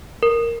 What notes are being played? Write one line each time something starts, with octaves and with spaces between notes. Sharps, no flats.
A#4